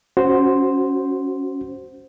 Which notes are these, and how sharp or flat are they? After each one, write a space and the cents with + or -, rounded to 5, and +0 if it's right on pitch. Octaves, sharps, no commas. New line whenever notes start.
C#4 +0 F#4 +0 C5 +0